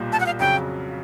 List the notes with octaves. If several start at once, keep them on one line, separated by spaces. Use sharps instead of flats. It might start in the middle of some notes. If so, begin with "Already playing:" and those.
Already playing: B1 A#2 G3
A5
F#5
F5
F2 C#3 F#3 G5